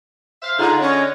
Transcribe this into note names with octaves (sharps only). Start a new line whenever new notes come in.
C5 E5 F5
D3 D#4 F4 G#4
C#4 C#5 D#5